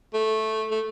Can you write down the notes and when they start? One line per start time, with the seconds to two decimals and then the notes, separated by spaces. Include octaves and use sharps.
0.14 A3
0.71 A3